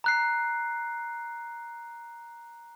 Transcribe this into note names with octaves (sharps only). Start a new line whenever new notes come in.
A#5 F#6 C7